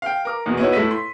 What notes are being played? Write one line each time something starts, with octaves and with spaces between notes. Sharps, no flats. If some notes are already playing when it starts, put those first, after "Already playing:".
F5 G5
A#4 D6
E2 B2
B3 D#4 E4 F#4 C#5
A2 E4 A4 E5 B6 D#7
C6